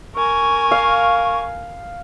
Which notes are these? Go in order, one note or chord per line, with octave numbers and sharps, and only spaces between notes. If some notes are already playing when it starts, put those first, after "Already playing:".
A#4 G#5 C#6
F5